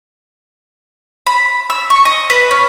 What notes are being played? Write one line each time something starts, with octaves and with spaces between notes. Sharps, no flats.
B5
E6
C#6
D#5
B4
C#4